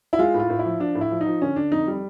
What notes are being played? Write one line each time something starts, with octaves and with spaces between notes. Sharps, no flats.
E4
G#3 F4
A2
F4
A2
E4
F3
F3 D4
A2
E4
F3
D#4
F3
D3 C#4
D3 D4
F2 D#4
G3